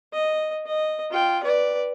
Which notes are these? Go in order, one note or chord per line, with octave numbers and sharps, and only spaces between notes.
D#5
D#5
F4 G5
B4 D5